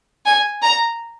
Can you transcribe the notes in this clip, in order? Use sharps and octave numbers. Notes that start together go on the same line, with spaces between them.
G#5
A#5